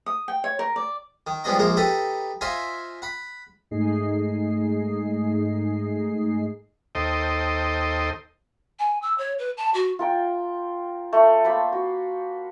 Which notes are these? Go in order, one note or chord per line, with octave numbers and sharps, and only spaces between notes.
D#6
G5
C#5
A#4
D5
D#3
F3 G3 G#3 B3 D4 D#5
A#1 G#3 A#3 A#4 C5
D#4 G4 A4 B4 D#5
F4 C5 D#5 E5 G#5
F#5 B5
G#2 A3 D#4 G#4 D#5 C7
D#2 A4 C5 D#5 G5
G#5
E6
C#5
B4
A5
F#4
F4 A#4 G5
A3 C#5
A#3 C5 A5 B5
F#4